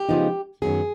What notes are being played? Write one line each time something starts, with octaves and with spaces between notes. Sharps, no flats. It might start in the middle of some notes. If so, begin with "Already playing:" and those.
Already playing: G4
C#3 F3 G#3 B3 D#4
F#2 D#3 F#3 B3 G#4